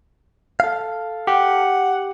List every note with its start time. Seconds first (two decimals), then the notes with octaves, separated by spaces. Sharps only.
0.60 A4 F5
1.27 G4 F#5